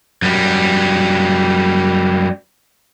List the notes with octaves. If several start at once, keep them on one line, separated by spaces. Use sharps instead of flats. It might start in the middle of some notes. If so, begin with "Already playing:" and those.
F#2 G3